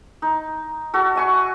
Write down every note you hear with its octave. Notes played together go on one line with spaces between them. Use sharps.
D#4
F#4 A4
E5 G#5 C#6